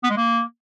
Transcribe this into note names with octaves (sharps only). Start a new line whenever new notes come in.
B3
G#3
A#3